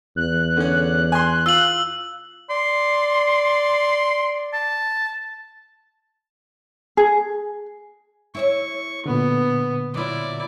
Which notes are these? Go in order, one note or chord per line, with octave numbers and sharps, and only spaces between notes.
E2 F#6
D3 C#4
G#5 C6
F4 E6 F#7
D5 C6
A5
G#4
E4 C#5 E5 C#6
A#2 D3 B3
F#3 E4 F4 D5